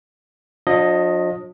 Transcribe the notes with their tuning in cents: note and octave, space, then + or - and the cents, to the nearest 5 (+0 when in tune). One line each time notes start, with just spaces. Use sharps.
F3 +45 D4 +0 D#5 +0